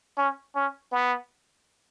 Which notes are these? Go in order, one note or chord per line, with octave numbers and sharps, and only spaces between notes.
C#4
C#4
B3